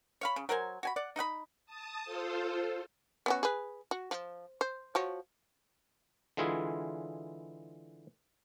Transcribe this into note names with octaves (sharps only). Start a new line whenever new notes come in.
C#5 F5 B5
C#3
F#3 A#4 C5 G#5
F#4 G#5 B5
D5 F#5
D#4 D#5 F#5 B5
A5 D#6
F4 A4 C5
B3 C#4 F#4
G#4 B4
F#4
F3
C5
F3 F#4 C#5
D3 E3 G#3 E4 F4 G#4